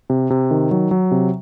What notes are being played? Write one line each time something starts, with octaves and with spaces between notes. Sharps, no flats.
C3
C3
D#3
F#3
F#3
C3